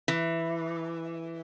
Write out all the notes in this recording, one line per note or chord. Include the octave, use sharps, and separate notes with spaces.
E3